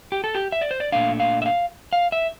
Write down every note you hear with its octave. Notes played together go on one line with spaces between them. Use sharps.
G4
A4
G4
E5
D5
C5
D5
A#2 A3 D4 F5
F5
E5
F5
F5
E5